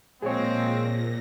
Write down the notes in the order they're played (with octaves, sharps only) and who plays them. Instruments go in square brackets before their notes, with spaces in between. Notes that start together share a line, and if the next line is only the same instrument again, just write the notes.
[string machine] A#2 A#6 [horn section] F3 G#3 C4 [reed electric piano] G#4 C#5